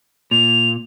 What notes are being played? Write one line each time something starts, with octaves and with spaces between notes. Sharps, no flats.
A#2 F7